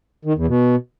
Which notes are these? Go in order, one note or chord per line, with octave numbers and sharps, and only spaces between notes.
D#3
E2
B2